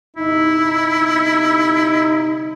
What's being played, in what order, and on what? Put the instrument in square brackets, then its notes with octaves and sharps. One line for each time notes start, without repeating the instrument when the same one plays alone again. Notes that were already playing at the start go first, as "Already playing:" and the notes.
[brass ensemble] G1 C3 D#4 [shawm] E4